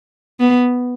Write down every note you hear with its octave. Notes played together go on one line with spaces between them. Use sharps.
B3